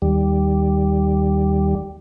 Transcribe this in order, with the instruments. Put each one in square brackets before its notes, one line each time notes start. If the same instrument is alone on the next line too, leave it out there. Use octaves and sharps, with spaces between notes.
[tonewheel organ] D#2 G3